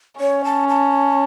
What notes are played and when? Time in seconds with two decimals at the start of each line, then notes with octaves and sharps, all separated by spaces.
0.20 C#4 C#5
0.44 A5
0.69 A5